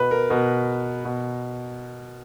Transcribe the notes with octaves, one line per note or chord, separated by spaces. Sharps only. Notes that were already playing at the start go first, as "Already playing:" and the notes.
Already playing: B2 B4
A#4
B2 A#4
B2